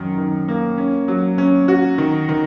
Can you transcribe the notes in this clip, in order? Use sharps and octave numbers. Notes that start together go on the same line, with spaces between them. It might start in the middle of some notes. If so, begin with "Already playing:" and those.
Already playing: F#2 D#3
D#3
A#3
C#4
F#3
C#4
F#4
D#3
D#3